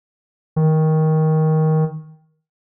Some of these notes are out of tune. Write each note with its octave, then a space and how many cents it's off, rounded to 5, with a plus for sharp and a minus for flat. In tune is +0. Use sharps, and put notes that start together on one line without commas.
D#3 +15